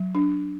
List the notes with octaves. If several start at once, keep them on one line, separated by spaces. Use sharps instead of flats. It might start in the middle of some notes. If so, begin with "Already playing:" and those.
Already playing: F#3
D4